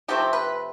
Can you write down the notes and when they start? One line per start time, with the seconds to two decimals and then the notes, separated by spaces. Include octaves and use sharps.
0.08 C3 F3 A3 C4 G4
0.33 B4